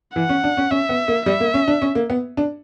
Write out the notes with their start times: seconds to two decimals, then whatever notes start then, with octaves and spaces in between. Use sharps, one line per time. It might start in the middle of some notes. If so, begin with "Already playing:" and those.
0.15 E3 F#5
0.29 C#4
0.44 D4
0.57 C#4
0.71 C#4 E5
0.89 B3
1.08 A#3
1.26 G3 E5
1.40 A#3
1.54 C#4
1.68 D4
1.82 C#4
1.95 A#3
2.10 B3
2.37 D4